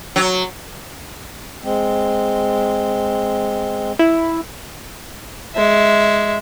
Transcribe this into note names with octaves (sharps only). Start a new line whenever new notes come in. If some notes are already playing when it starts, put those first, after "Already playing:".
F#3
G#3 C4
E4
G#3 E5